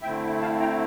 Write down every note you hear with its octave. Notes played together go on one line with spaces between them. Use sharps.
D3 A3 C4 E4 E5 G5
F5 A5
G5 A#5